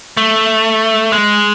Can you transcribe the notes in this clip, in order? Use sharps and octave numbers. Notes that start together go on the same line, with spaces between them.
A3
G#3